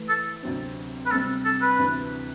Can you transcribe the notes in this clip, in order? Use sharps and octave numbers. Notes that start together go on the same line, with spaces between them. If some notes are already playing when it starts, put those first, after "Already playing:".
Already playing: E3 A3 E4
A4
D2 C3 F#3 C4
B4
C3 G3 C4 A4
A4
B4
D2 C3 E3